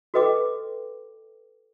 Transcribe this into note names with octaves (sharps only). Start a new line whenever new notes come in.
F#4 A4 B4 D#5 G5 D6